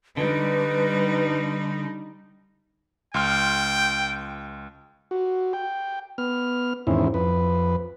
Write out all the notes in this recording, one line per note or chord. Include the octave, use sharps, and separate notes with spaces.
D3 G3 D#4 B4
C#2 G5 C6 F6
F#4
G5
B3 F6
E2 G#2 D#3 C4 C#4 E4
F2 B4